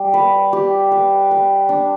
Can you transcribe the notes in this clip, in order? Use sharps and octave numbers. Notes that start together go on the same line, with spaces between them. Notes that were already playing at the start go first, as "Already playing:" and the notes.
Already playing: G3
B4
G4
B4
B4
D4